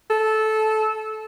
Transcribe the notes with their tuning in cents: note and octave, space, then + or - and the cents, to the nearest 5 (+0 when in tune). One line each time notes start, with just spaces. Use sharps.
A4 -15